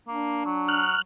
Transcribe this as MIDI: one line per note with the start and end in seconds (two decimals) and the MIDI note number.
0.07 0.43 58
0.07 0.83 62
0.45 0.96 54
0.69 1.02 89
0.69 1.02 90